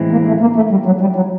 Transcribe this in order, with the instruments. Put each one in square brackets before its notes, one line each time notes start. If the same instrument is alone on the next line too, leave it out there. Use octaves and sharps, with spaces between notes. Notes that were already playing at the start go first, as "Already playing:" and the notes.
Already playing: [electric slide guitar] A2 E3 G#3 C4 E4
[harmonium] A#3
A3
A#3
A3
G3
F#3
G3
F#3